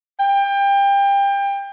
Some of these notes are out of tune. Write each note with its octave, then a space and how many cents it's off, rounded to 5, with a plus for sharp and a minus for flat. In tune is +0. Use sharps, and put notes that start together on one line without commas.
G5 +25